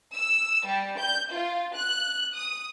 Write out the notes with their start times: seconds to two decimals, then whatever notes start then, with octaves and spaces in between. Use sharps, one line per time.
0.15 E6
0.66 G3
0.98 G6
1.32 F4
1.74 F#6
2.35 D#6